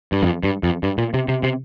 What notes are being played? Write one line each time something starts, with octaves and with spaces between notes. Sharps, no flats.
G2
F2
G2
F2
G2
A#2
C3
C3
C3